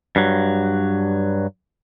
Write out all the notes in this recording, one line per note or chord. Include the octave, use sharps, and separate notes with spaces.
G2 F#3